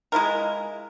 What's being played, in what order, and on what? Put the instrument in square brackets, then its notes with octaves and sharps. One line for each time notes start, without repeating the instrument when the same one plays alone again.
[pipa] G#3 E4 F4 A#4